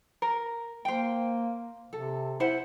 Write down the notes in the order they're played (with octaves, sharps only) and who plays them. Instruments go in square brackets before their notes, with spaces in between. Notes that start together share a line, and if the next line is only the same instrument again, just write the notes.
[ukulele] A#4
[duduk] A#3 [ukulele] C5 G5
[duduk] C3 [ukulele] A4
[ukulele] E4 C5 F#5